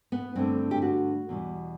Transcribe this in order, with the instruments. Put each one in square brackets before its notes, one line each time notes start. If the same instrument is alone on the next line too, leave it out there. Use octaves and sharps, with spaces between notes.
[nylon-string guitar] B3
G2 D3 A3 C4
G4
F#4
E2 B2 G3